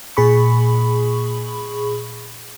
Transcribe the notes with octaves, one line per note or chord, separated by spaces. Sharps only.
A#2 G#4 B5 C#6